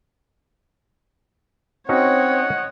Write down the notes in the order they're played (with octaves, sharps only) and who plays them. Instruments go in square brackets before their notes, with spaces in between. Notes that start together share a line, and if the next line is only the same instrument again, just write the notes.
[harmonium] C4 [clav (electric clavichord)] C#4 D#4 F#4 [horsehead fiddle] C#5 D#5 [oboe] F#5